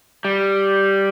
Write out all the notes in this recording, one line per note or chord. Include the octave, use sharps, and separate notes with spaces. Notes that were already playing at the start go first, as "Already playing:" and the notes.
G3